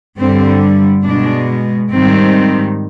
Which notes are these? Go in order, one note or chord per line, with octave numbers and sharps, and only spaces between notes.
G2 D3 G3 C4
B2 G#3 D4
G#2 D#3 G3 C4